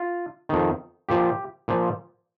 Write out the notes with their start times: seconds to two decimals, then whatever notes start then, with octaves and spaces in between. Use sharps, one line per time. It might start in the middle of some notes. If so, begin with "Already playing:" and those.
Already playing: F4
0.49 F2 D#3
1.09 A#2 F3 G4
1.68 A#2 F3